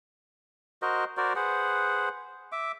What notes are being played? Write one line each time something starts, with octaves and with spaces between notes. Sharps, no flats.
F#4 A#4 C5 D#5
F#4 A#4 C5 D5
G#4 B4 C5 F#5
E5 D6